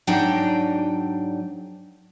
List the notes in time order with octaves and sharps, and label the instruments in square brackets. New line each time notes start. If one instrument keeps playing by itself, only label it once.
[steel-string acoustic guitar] G#2 F#3 D4 D#4 G5